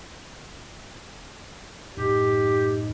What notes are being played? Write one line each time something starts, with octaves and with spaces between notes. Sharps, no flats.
F#2 A2 D#4 G4